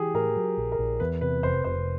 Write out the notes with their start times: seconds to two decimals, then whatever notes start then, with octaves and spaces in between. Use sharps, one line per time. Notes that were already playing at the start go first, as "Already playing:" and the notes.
Already playing: E3 G4 G#4
0.14 A2 A#4
0.36 F#3
0.57 A#1
0.72 A#4
0.79 A#1
1.00 E2 B4
1.21 C3 B4
1.43 F1 C5
1.64 F1 C5